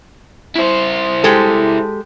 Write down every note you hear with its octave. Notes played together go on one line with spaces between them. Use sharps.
E4 C5
G#3 G4 A4